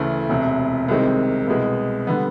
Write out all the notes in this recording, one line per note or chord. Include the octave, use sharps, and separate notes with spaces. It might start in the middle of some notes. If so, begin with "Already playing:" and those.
Already playing: D2 C#3 E3 A3
E1 D2 C3
C2 C3 D#3 G#3 C4
C2 B2 G#3
D3 G3 B3